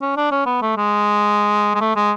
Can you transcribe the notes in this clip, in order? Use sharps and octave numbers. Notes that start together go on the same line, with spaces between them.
C#4
D4
C#4
B3
A3
G#3
G#3
A3
G#3